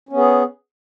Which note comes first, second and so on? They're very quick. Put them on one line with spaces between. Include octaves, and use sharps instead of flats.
C#4 B3 G#4